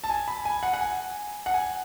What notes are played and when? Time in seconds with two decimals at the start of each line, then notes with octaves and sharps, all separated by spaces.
0.04 A5
0.10 G#5
0.28 B5
0.45 G#5
0.63 F#5
0.74 F#5
0.81 G#5
1.46 F#5
1.54 G#5